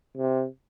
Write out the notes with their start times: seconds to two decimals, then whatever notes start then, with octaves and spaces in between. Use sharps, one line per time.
0.17 C3